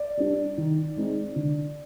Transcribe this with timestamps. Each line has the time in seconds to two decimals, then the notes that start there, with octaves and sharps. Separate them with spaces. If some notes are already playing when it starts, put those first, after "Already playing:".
Already playing: D5
0.17 G3 D4
0.58 D#3
0.96 G#3 C4 D#4
1.36 D3